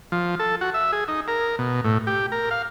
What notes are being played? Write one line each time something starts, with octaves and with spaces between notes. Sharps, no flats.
F3
A4
F#4
E5
G#4
D#4
A#4
B2
A2
G4
A#4
F5